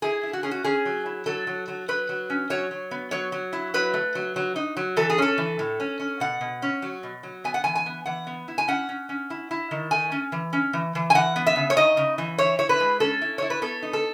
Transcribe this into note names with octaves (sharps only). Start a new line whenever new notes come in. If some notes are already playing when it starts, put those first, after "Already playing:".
E4 G#4
E4
F#4
C#4 G#4
F#4
C#4 G#4
F#3
E4
F#3 A4
F#3
F#3
F#3 B4
F#3
C#4
F#3 C#5
F#3
B3
F#3 C#5
F#3
E4
F#3 B4
A3
F#3
F#3
D#4
F#3
E3 A4
G#4
C#4 A4
E3
A2
C#4
C#4
B2 F#5
B2
C#4
F#3
B2
F#3
B3 G#5
F#5
E3 G#5
G#5
B3
E3 F#5
B3
E4
G#5
C#4 F#5
C#4
C#4
E4
E4
D#3
A3 G#5
C#4
E3
C#4
E3
E3
G#5
E3 F#5
B3
E5
C#3
C#5
D#4 D#5
C#3
E3
E4 C#5
E4 C#5
B4
G#3
C#4 A4
E4
E4 C#5
B4
B3 A4
D#4
A4